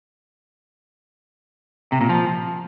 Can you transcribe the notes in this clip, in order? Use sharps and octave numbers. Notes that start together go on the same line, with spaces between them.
C3
A#2
F3